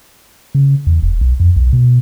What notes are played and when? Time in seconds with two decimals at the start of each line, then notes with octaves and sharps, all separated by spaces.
0.55 C#3
0.87 E2
1.02 E1
1.21 B1
1.40 F2
1.56 B1
1.73 B2